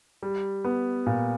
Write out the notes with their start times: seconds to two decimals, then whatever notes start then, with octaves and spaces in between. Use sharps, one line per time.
0.23 G3
0.65 B3
1.06 A#2